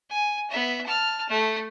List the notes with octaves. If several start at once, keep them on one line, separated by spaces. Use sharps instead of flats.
G#5
B3 E5
A5 F6
A3